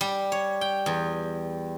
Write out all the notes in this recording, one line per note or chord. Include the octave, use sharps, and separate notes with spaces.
G3
C#5
G5
E2